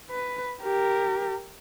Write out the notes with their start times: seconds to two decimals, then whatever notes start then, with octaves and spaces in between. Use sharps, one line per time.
0.10 B4
0.62 G4 A#4